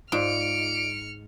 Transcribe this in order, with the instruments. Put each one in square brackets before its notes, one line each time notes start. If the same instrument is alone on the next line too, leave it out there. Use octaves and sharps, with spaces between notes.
[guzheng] G#2 [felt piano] F4 D5 [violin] F6 C#7 [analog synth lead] D7